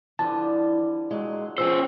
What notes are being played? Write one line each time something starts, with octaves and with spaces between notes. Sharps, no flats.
D3 E3 F3 G3 A5
A#2 F#3 G#3
F3 C#4 G#4 C5 E6